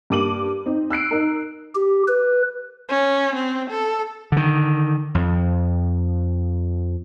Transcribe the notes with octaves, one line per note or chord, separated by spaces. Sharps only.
G2 A#3 D6 D#7 F#7
C4 D#4
E6 F#6 C7 D7
D#4 A#4
G4
B4
C#4
C4
A4
D3 D#3
F2